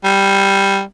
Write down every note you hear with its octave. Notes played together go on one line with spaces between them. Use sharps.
G3